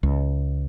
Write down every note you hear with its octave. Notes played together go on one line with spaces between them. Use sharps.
C#2